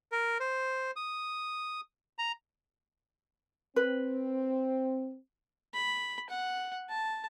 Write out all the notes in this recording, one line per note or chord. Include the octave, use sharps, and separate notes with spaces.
A#4
C5
D#6
A#5
C4 B4
B5
F#5
A5